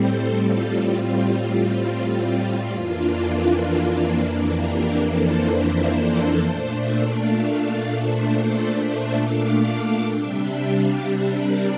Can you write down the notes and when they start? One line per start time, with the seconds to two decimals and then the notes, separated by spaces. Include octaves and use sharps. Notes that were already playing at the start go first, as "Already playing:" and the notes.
Already playing: A2 G3 C4 A4 C5
0.40 F4 A4
0.86 F4
2.71 F2 E3 A#3 D4
4.56 G4 A#4
5.03 A4 C5
5.49 C5 E5
5.95 A4 C5
6.41 A#2 A3 D4 A4 C5
6.73 C5 E5
7.04 D5 F5
7.35 F5 A5
7.66 D5 F5
7.96 C5 E5
8.27 A4 C5
8.73 C5 E5
9.20 D5 F5
10.12 C3 G3 D4 E5 G5
10.43 E5 G5
10.74 F5 A5
11.05 C5 E5
11.36 A#4 D5